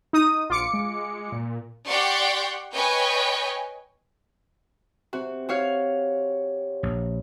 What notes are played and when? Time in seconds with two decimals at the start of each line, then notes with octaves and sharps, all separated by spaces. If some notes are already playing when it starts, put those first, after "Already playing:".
0.13 D#4 D#6
0.50 A#1 F4 D6 C#7
0.74 G#3
1.32 A#2
1.88 G4 D5 F#5 G5 C6 C#6
2.73 B4 C#5 D#5 G5 G#5 C#6
5.13 C3 C4 F#4
5.49 F#4 C#5 F5
6.83 A#1